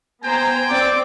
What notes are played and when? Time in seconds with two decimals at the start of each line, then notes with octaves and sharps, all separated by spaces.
0.24 B3 C5 G5 G#5 A#5
0.71 C4 D5 D6